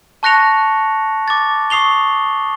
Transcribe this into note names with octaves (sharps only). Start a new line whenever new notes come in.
A5 C#6 F#6 A#6 C#7 F7
D6 A6
C#6 D#6 C7 F7 G7